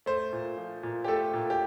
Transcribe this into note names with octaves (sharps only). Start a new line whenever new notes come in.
A3 C5
A#2
F3
A#2
G4
A3 A4
A#2
G4